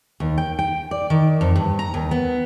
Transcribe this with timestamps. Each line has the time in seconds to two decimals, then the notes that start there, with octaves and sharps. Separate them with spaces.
0.20 D#2
0.38 G5
0.59 G5
0.91 D5
1.10 D#3
1.41 F2
1.56 G2
1.79 A#5
1.94 D#2
2.11 B3